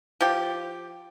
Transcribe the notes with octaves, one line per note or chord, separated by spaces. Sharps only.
F3 G4